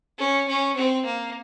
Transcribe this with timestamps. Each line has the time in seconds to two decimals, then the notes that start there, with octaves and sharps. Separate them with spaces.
0.19 C#4
0.48 C#4
0.76 C4
1.06 A#3